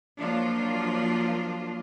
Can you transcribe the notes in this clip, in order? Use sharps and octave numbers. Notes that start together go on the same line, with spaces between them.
F3 F#3 A#3 D4 F4